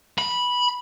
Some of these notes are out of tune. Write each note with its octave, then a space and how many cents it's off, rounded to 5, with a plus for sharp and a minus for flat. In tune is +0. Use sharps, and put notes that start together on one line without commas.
B5 -10